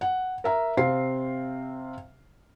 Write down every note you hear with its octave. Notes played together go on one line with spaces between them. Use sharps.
F#5
A#4 E5 A#5
C3 C4 F5 C7